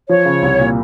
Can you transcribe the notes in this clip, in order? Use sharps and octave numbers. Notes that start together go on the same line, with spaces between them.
F3 C#5
C#3
C2
A#2